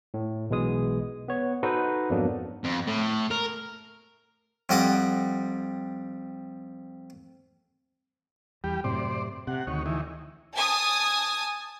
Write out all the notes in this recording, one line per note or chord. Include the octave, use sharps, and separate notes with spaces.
A2
B1 B2 E3 G#3 D#6
B3 C#5
D#4 F#4 A4 B4 C5 D#5
F2 G#2 F#3 A#3 B3 D4
F2
A2
A#4
F2 G3 D#5 F#5 D6
E2 G3 G4
F#2 A2 C3 C5 D5
C3 F#5
D2 D#3 C#5
D#3 E3
G#5 A5 D#6